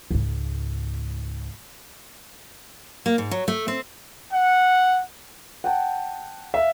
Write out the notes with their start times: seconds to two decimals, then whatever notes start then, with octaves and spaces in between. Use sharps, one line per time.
0.11 C#2 G#2
3.06 A#3
3.18 G#2
3.31 F#3
3.48 A3
3.68 C4
4.33 F#5
5.64 F#5 G5 A5
6.54 E5 F5